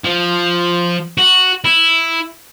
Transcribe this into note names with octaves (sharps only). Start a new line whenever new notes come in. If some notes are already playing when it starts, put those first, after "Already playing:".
F3
F#4
E4